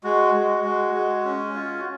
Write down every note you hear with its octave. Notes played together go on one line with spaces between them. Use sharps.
G#3 F#4
G#3
G#3
G#3
C#4
F4
F#4